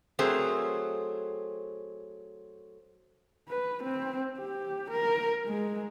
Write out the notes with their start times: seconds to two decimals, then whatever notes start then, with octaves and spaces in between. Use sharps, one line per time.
0.19 F#3 A3 C4 G#4 A#4 C5
3.49 B4
3.83 C4
4.39 G4
4.90 A#4
5.47 G#3